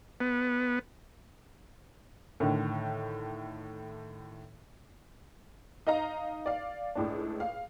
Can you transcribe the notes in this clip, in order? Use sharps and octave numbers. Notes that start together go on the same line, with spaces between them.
B3
A2 D3 D#3
D#4 D#5 F5 A#5
D5 F5
C#2 A2 D4
F5